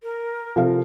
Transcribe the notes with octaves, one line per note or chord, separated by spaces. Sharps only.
A#4
C3 F3 A4 F5